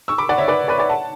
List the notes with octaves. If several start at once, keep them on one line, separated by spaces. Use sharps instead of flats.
C#6 E6
B5 D6
D5 F#5
C#5 E5
B4 D5
B4 D5
B4 D5
F#5 A5